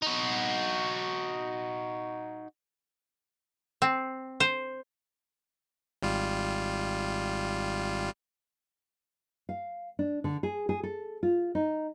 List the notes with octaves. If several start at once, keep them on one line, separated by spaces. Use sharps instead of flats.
D#4 F#4
C4
C5
G#1 G3 F4
F5
D4
D3
G#4
G#4
A4
F4
D#4